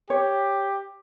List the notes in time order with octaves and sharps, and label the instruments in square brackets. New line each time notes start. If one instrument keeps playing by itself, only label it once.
[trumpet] G4 [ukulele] C#5